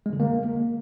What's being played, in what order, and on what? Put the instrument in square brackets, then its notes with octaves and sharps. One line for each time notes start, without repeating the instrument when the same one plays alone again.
[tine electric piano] G#3
D3
A#3